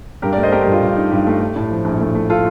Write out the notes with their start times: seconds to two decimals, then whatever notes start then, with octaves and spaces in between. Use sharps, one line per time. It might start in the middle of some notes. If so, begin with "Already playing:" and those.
0.22 G2 G4 A#4
0.32 A3 A#4 D5
0.43 C5 D#5
0.52 A3 G4 A#4
0.62 G2 G4
0.72 F4
0.82 G2
0.96 D#4
1.11 G2 G4
1.27 A3
1.41 A3
1.56 A2
1.71 F3
1.85 A#1
2.01 A3
2.15 A3
2.30 F4 A4